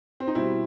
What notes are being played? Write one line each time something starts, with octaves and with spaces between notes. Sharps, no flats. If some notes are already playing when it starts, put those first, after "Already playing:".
C4
D#4
B2 G3 C4 E4